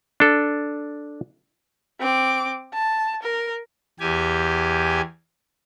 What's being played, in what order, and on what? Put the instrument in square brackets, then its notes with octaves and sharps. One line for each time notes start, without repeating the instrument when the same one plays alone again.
[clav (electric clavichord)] D4 A4
[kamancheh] C4 D6
A5
A#4
[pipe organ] E2 G4 G#5